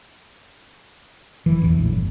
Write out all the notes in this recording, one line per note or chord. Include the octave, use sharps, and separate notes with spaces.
F1 E3
A1 E2
A#1 A2
G1